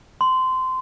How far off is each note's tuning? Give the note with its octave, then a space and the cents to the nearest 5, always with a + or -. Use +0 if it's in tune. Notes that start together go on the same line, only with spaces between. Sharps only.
C6 -20